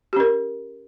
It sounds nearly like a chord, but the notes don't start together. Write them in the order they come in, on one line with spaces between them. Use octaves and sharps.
G4 C#4 A#4